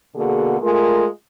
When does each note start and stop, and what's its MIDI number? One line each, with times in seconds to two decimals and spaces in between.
0.16 0.57 47
0.16 0.57 50
0.16 0.57 58
0.16 0.57 66
0.16 0.57 68
0.61 1.05 56
0.61 1.05 57
0.61 1.05 65
0.61 1.05 70